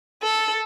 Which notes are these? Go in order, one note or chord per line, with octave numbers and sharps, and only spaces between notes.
A4